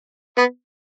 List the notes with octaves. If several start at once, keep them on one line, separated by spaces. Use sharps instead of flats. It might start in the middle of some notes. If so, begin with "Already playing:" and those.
B3